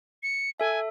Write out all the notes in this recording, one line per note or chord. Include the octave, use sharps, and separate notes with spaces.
C#7
A4 E5 G#5